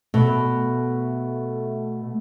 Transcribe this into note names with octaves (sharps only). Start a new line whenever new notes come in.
B2 A3